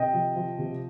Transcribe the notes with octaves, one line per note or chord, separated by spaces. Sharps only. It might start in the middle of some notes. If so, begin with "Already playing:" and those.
Already playing: C3 D#5 G5
F3
F3
C3